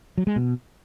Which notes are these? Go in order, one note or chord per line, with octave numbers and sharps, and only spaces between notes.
F#3
G#3
B2